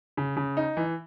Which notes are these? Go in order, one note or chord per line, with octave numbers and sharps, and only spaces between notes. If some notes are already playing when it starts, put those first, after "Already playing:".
C#3
C#3
D#4
E3